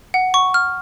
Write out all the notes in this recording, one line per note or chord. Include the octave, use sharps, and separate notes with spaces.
F#5
C#6
F6